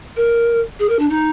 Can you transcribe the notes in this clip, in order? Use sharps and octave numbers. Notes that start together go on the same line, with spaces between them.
A#4
G#4
A#4
D4
D#4